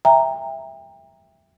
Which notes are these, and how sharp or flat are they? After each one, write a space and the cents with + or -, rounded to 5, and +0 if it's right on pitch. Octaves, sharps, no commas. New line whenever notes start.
E5 +0 G5 +30 A#5 +0